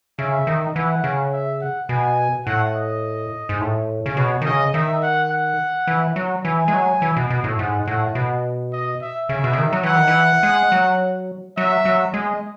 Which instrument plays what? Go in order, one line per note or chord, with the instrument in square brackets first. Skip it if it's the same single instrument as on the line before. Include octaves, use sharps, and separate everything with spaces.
[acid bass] C#3 [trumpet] E5
[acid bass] D#3
[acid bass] E3 [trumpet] F#5
[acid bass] C#3
[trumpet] E5
F#5
[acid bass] B2 [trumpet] G#5
[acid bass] A2 [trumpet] F#5
[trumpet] D#5
[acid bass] G#2
A2
C#3
[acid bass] B2 [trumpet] C#5
[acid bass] D#3
[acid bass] C#3 [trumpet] D#5
[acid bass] D#3 [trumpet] E5
[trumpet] F#5
F#5
[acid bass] E3
F#3
[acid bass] E3 [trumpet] G#5
[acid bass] G#3
F#3
E3
B2
B2
A2
[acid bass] G#2 [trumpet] F#5
[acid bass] A2 [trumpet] F#5
[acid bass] B2
[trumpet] D#5
E5
[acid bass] C#3 [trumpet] E5
[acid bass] B2
C#3
D#3
F#3
[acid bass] E3 [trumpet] F#5
[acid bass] D#3
E3
G#3
F#3
[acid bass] F#3 [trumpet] E5
[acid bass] F#3
[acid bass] G#3 [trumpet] D#5